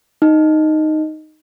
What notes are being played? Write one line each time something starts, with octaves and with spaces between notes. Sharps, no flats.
D#4